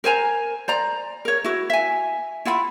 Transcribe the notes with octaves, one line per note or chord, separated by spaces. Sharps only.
A#4 C5 G#5 A#5
C5 D5 A#5
A#4 C#5
E4 F#4
E5 G#5
E4 F4 F#5 B5